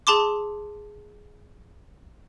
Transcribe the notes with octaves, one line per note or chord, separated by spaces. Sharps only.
G#4 A5 C6 D6